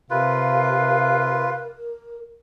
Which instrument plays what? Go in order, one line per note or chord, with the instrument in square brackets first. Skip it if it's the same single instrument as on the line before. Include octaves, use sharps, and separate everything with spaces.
[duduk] C3 [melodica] F4 B4 [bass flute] A#4 [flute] F5